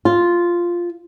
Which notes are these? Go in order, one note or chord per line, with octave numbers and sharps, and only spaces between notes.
F4